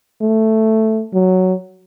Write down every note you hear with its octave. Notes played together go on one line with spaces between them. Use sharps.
A3
F#3